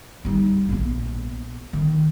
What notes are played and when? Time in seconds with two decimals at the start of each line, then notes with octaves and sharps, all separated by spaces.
0.25 G3 D#4
0.69 A#1 B3
1.73 D#3